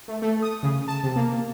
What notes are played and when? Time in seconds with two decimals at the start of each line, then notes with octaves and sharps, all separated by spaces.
0.08 A3
0.22 A3
0.42 D#6
0.63 C#3
0.88 A5
1.03 C3
1.16 A#3